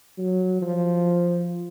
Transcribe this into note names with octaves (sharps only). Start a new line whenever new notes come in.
F#3
F3